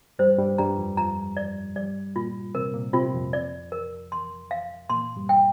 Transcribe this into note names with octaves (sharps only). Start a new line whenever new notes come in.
G2 G3 C5
G2 G3
G2 G3 A#5
F2 F3
F2 F3 A#5
D5
G2 G3 D5
A#2 A#3 F4
C3 C4 A#4
A#2 A#3
C3 C4 F4
F2 F3
D5
A#4
C6
F5
A#2 A#3 C6
G2 G3
G5